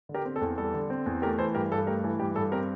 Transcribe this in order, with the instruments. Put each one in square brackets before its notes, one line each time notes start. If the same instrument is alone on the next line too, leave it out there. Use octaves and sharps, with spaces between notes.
[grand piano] D3
G4 A#4
C4
A4
E2
G3 A4
D3
C4
E2
A3 G4 A#4
E3 A4 C5
G2 G4 A#4
G2 A4
A3 G4 A#4
E3 A4
G2 G4
G2 A4
C4 G4 A#4